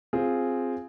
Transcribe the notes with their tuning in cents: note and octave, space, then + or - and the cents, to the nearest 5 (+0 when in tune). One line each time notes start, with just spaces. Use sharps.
C4 +0 F4 +0 G#4 +0